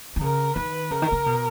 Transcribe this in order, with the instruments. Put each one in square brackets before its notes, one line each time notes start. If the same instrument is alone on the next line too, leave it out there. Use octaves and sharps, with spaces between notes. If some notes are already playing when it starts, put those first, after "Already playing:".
[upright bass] D#3
[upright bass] C#3 [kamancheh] A#4
[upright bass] D#3 [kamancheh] B4
[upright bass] C#3 [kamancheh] A#4
[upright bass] D#3
C#3
B2